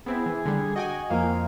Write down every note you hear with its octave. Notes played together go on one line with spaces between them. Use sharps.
B3 C4 E4 G#4 E6
E3
D3 G3
F#4 D#5 G5 G#5
F2 A#3 F4 F5